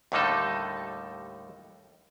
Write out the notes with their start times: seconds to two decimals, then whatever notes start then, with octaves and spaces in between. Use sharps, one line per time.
0.12 D#2 A2 D3 G3 D#4 A4